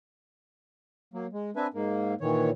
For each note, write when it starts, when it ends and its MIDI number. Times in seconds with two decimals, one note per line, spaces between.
1.14 1.26 54
1.14 1.26 58
1.33 1.50 56
1.56 1.67 60
1.56 1.67 62
1.56 1.67 71
1.56 1.67 76
1.56 1.67 80
1.74 2.14 44
1.74 2.14 58
2.21 2.50 46
2.21 2.50 51
2.21 2.50 52
2.21 2.50 73